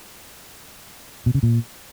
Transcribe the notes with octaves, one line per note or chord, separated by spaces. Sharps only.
B2
C#3
A#2